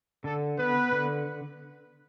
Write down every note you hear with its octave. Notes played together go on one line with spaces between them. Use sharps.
D3 A4
B3 B4
D3